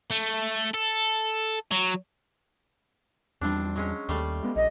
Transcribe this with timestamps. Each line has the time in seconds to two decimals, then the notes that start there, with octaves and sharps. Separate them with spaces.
0.11 A3
0.74 A4
1.71 F#3
3.41 E2 F3 G3 C4 D4
3.76 F#3 G#3 C#4
4.09 D#2 G3 A3 F5
4.43 G#3 B3
4.56 A#1 D#5